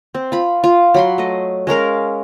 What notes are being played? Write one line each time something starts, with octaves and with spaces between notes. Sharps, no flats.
C4
F4 B5
F4
F#3 B5 C6
A3 D#5
G#3 C#4 A#4 F5